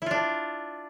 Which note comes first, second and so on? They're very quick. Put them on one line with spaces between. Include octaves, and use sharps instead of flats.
E4 F4 D4